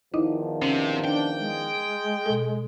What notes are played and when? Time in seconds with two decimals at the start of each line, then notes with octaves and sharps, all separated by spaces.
0.14 E2 D#3 F3 D#4 E4 D#5
0.62 C3 C#4
1.04 D4 G5
1.40 G#3
2.26 B2 A4